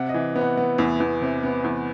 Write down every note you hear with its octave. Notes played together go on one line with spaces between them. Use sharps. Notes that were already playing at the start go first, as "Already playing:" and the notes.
Already playing: C3 F#5
D#5
E3
B3
F#5
B3
E2
E2
C3
B3
E2